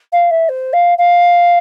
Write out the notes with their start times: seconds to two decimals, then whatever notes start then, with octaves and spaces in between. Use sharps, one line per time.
0.12 F5
0.31 E5
0.49 C5
0.73 F5
0.98 F5